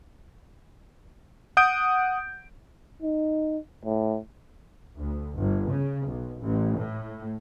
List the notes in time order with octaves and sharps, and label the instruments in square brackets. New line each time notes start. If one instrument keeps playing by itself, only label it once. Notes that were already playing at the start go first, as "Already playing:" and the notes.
[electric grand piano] F#5 D#6 G6 D7
[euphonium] D#4
A2
[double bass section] D2
G1
C#3
B1
A1
A2